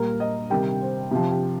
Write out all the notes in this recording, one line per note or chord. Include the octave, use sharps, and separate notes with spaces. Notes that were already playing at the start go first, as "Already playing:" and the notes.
Already playing: A#2 G3 A#4
D#5
C3 D#3 G3 G5
C5
C3 F3 G4
G4